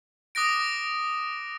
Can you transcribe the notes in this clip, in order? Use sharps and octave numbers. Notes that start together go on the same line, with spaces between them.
D6 D#6 F#6 A#6 D7